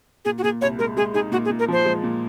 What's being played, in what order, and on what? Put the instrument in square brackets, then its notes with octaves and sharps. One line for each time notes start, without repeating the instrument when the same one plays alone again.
[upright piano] A#2 [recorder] G#4
[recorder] F#4
[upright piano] A#2 [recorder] G#4
[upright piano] C2 [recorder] C#5
[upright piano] G#3 [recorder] A#4
[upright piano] G#3 [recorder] G#4
[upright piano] D#4 [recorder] G#4
[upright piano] A#2 [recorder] F#4
[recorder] G#4
[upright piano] A#2
[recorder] A#4
[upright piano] F3 [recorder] C5
[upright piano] G#3
A#2